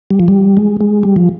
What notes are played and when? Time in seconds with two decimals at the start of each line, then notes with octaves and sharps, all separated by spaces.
0.11 G3
0.20 F3
0.28 G3
0.57 G#3
0.81 G#3
1.03 G3
1.16 F3